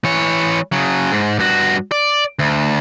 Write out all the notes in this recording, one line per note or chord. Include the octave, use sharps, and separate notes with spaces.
E3 C#5
C#3 F#3
G#2
G2 F#4
D5
D2